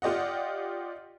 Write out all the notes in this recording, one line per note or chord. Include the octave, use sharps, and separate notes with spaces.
F4 G4 D5 D#5 F#5